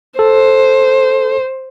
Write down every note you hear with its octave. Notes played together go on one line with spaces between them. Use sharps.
A4 C5